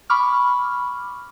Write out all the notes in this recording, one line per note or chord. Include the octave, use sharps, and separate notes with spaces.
B5 C#6 D6 F6